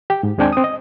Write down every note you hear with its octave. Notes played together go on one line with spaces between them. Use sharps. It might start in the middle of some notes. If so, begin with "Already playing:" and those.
G4 G5
G#2
D#2 G#3 C4 D4 G5 G#5
C4 D#6
D#5